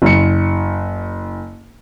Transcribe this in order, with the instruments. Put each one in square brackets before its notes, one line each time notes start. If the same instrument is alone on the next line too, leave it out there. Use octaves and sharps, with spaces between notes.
[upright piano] F#1 C#7